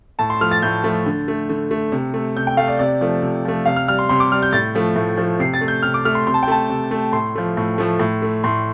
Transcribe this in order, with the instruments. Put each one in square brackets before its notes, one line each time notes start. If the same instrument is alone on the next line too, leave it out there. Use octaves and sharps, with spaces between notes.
[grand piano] A2 A5
C6
F3 A3 F6
A6
A2 G6
F3 A3
D3
A3
D3
A3
C3
A3
C3 G6
G5
A3 F5
D5
C3 D5
F3 A3
C3
F3 A3
C3 F5
F6
G3 F6
C6
C3 C6
D6
G3 F6
G6
A2 A6
F3 A3
A2
F3 A3
C3 C7
A6
A3
G6
C3 F6
D6
A3 F6
C6
C3 C6
A5
G5
A3 A5
C3
A3
A2 C6
F3 A3
A2
F3 A3
A2
A3
A2 C6